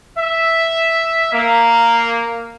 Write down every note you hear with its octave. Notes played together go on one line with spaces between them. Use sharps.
E5
A#3